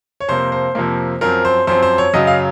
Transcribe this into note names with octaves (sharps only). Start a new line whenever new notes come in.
C#5
F2 C3 F3 A#3 C5
C5
F2 C3 F3 A#3
F#2 F3 C4 A#4
C5
F#2 F3 C4 C5
C5
C#5
F#2 C#3 F#3 D#5
F5